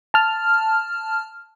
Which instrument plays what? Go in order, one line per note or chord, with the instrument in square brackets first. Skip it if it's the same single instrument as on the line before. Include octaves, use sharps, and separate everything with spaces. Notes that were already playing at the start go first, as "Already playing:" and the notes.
[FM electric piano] A5 F6